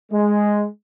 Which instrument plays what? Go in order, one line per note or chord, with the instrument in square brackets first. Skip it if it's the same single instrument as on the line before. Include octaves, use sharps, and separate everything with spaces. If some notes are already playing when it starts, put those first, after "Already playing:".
[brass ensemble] G#3